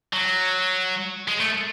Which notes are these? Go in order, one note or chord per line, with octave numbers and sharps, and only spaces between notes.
F#3
G#3
A3